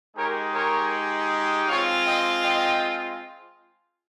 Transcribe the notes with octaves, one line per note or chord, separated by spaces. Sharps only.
G#3 D#4 G4 A#4 C#5
A#4 C#5
G#3 C4 F4 C#5 F5
D#5 G5
D#5 G5